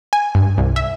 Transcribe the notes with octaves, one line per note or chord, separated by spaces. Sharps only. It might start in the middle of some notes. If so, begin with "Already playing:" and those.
G#5
G2
C2
E5